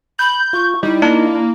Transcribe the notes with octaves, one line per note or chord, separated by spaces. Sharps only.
B5 G6
F4 C#6
G3 D#4 E4
A#3 D4